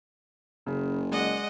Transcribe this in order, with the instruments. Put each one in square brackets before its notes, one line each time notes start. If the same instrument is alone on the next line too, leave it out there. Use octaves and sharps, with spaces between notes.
[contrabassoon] F#1 [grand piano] C#3
[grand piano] G#3 D5 [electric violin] D#5 F#5